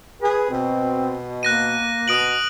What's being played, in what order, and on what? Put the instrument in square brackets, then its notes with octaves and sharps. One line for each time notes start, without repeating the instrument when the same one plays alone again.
[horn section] G#4 [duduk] B4
[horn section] B2 [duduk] C4
[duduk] A#3 [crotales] F#6 A#6 D#7
[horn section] B2 [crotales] D#6 D7 F#7